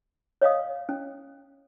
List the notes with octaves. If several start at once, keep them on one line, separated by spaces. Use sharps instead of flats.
C#5 D#5 F5 D#6
C#4